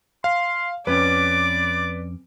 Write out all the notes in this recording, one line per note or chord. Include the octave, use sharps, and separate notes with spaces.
F5 C6
F2 C#4 B4 D5 D6